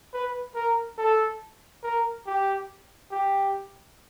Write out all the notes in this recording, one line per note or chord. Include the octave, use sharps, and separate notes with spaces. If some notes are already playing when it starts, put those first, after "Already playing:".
B4
A#4
A4
A#4
G4
G4